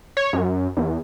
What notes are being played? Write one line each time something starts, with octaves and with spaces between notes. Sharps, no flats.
C#5
F#2
E2